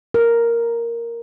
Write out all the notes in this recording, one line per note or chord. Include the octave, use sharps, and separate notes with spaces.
A#4